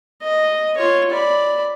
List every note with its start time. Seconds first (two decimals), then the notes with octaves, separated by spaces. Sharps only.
0.23 D#5
0.77 F4 C#5
1.11 D5 B5